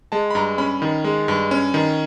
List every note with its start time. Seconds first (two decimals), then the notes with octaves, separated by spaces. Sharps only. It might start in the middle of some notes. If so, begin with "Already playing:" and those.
0.12 G#3 A5
0.30 B5
0.35 G2 A#5
0.58 C#4 B5
0.82 D#3
1.04 G#3
1.28 G2
1.51 C#4
1.74 D#3